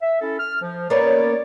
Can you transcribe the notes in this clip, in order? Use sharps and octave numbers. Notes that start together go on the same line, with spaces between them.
E5
C#4 E4 A4
F6
F3
A#3 B3 C#4 C#5 D5